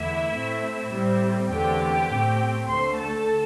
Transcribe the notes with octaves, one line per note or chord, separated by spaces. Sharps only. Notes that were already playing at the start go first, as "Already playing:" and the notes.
Already playing: E2 D3 A3 E4 E5
A2 A3 C4
A2 G3 C4
E2 D3 A3 C4 G4 G5
A2 A3 C4
D2 D3 A3 C5 C6
A4 A5